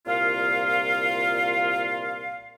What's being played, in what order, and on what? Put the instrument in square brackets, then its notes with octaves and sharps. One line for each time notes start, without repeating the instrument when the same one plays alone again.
[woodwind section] C2 A#2 F4 F5